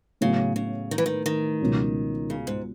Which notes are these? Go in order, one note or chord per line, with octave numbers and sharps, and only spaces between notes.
A2 C#3 F#3 B3
C#3
D#3
E3
D#3
D#3
C#2 B2 F#3 C#4
C#3
G#2